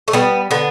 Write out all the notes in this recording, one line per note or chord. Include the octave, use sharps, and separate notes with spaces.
A3
G3 B3
D3 B3